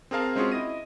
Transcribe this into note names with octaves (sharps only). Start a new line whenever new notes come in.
C4 G#4 A#4 F5 A5
G#3 C4 C#4 F4 F#4 G#4
E4 D#5 A#6 D#7